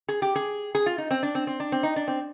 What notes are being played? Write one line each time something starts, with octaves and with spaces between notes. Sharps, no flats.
G#4
G4
G#4
G#4
F4
D#4
C4
D4
C4
C4
D4
C4
D#4
D4
C4